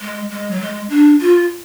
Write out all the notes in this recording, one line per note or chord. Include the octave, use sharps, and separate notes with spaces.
G#3
G#3
F#3
G#3
D4
F4